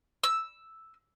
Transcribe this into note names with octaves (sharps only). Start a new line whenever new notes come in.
E6